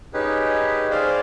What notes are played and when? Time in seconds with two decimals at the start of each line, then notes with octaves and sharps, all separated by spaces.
0.13 C#4 D#4 G4 G#4 B4
0.91 G#4 C5 D5 F5